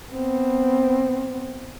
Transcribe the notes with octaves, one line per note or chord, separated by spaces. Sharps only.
B3 C4